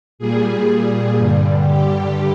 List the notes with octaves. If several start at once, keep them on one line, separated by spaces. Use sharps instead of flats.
A#2 G3 G#4
G#4
G2 D3 G3
G4